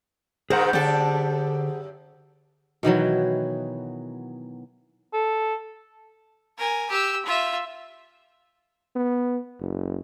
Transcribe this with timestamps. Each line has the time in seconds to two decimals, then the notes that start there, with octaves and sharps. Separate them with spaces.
0.50 G2 B2 D#3 G#4 A#4 C5 F#5
0.73 F#2 D3 D4 G4 A4
2.83 B2 D#3 E3 F#3
5.14 A4
6.58 A#4 G#5
6.90 G4 E6
7.26 F4 E5
8.96 B3
9.60 F#1